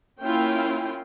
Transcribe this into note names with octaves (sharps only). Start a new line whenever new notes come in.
A#3 C#4 E4 F4 G5